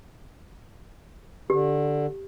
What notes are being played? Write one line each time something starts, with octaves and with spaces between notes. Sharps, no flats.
D3 G4